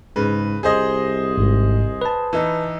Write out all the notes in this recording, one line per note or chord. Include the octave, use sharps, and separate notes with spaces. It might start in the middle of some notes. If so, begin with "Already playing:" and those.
G#2 C#3 B4
C2 G#4 C5 D#5
G#1 G#2
B4 A5
E3 D#4